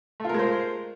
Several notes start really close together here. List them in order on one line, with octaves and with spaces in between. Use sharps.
A3 F4 A#4 G#3 C5